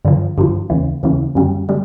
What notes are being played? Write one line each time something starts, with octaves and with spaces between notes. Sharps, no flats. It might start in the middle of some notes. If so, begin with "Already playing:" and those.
G2 D3 F3
G2 D3 F3
D#2 C#3 E3
D#2 C#3 E3
F#2 D3 G3
D3 G3